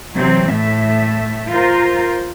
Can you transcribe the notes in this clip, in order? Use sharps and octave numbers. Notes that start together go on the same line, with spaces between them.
C3 E3 F#3 C4
A2 A3 E5
F4 A#4 C5